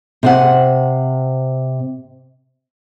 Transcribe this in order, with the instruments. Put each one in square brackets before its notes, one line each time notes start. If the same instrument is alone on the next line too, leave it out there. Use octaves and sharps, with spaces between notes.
[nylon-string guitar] C3 C5 F#5